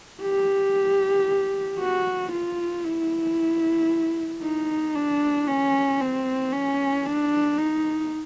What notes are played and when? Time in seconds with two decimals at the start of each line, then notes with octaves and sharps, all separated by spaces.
0.22 G4
1.79 F#4
2.32 F4
2.85 E4
4.43 D#4
4.95 D4
5.48 C#4
6.01 C4
6.53 C#4
7.06 D4
7.58 D#4